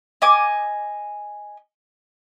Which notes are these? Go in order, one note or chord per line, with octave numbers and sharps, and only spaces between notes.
D#5 G#5 D6